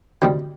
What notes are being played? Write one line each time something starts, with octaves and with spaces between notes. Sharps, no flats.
D2 C3 D#3 G3 C4